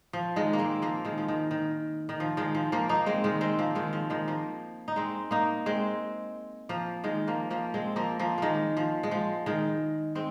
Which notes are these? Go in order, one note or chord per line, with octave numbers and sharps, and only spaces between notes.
F3
D#3 G#3
A#3
G#3 C4
F3 A#3
D#3 G#3
F3
D#3
D#3
D#3
F3
D#3 G#3
F3
F3 A#3
A#3 D#4
G#3 C4
D#3 G#3
G#3 C4
F3 A#3
D#3 G#3
F3
D#3 G#3
F3 A#3
D#4
G#3 C4
A#3 D#4
G#3 C4
F3 A#3
D#3 G#3
F3 A#3
F3 A#3
G#3 C4
F3 A#3
F3 A#3
D#3 G#3 A#3
F3
G#3
F3
D#3 G#3
G#3 C4